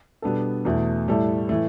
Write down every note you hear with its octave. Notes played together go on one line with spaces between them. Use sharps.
B2 G3 B3 D4 A4
E2 B2 A3
A2 G3 E4 A4
A2 E3 A3